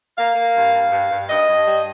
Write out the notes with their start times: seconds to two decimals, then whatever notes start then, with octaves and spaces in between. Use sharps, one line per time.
0.17 A#3 F5
0.35 A#3
0.54 G2
0.73 G2
0.91 G2
1.11 G2
1.29 G2 D#5
1.47 G2
1.66 G3